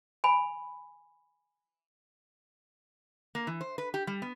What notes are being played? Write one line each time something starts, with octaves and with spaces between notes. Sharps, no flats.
G#5 B5
A#3
E3
C5
B4
G4
G3
B3